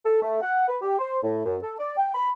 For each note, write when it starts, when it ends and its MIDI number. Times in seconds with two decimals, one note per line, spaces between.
0.06 0.18 69
0.22 0.39 57
0.41 0.67 78
0.68 0.77 71
0.82 0.97 67
0.99 1.19 72
1.24 1.45 45
1.45 1.57 42
1.63 1.74 69
1.79 1.93 74
1.97 2.14 79
2.15 2.30 83